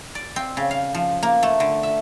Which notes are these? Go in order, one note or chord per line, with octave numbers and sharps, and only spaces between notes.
D5
C4
C#3
F5
F3
A#3
A3
D3
E5